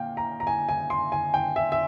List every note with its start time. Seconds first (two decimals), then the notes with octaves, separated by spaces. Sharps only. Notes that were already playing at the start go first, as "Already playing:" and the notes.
Already playing: A#2 F5 G5
0.17 A#5
0.40 A#5
0.47 G#5
0.68 G#5
0.90 C6
1.12 G#5
1.34 G5
1.56 E5
1.72 E5